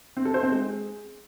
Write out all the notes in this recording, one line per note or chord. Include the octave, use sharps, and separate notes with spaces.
C4
A4
C5
C4
G#3